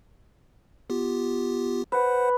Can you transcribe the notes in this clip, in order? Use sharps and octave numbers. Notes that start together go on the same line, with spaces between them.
B3 F4 G4
B4 C5 F#5